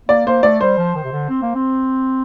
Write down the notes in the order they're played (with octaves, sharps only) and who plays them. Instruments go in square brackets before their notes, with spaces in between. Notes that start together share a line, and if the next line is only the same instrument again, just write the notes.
[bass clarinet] A#3 [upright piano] D5
[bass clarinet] A#3 [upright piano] C5
[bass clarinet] A3 [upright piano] D5
[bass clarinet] G3 [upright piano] C5
[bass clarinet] F3
D#3
C3
D3
C4
A#3
C4